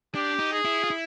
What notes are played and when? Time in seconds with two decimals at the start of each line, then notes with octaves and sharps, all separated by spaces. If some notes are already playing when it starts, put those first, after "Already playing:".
0.15 D4 G4
0.39 D#4
0.52 G#4
0.65 E4
0.84 F4
0.90 E4